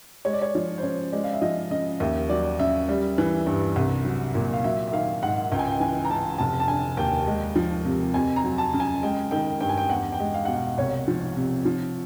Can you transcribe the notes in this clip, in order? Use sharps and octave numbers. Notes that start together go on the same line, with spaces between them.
G#3 C#5
D5
C#5
F3
C5
C#3 C#5
G#3 D5
F5
E5
F3 D#5
C#3 D#5
D#2 E5
F#3 D5
C#3 E5
G3
E3
G2
C2
F#3
A#2
F5
F#3 E5
E5
D#3 F5
G#2 F#5
C#2 G5
G#5
G5
E3 G#5
A#5
C#3 A5
F1 A5
A5
D3 G#5
D#2 G5
G#3
F3
C3
F2 G#5
A#5
F#3
A5
C#3
G#5
G#3 G5
D#3 G5
G2 G5
G#5
G5
E2 F#5
G5
G#3
F5
B2 F#5
F5
C2 C#5
F3
C3
F3